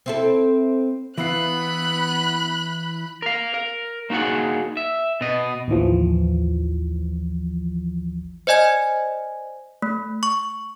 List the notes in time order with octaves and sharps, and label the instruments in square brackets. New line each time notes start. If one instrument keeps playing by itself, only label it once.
[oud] C4 E4 A4
[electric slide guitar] E3 E4 F5 [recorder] B3 [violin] B5 F#6
[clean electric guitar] A#4 F5
A#4
A#3 D#4 F#4 G#4 F#5
E5
B2 D#5
[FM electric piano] A1 D#2 E3 F3
[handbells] C5 D5 D#5 G#5 G#6
A3
C#6